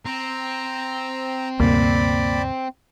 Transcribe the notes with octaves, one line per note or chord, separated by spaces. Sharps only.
C4 A#5
D2 G2 C3 A#3 D5 B5